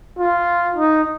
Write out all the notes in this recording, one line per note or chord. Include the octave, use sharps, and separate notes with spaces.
F4
D#4